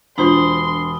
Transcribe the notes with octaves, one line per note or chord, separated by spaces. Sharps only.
E1 D4 F4 C5 B5 C6 D#6 G7